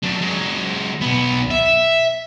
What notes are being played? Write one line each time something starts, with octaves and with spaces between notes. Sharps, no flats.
F#3 D4
F#3 G#3
B1 B3
E5